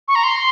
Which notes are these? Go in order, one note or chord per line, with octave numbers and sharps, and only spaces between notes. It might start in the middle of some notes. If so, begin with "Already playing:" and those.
C#6
A#5
C6